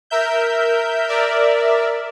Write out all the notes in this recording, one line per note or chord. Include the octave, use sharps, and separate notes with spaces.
A#4 E5 G6
A#4 D5 E5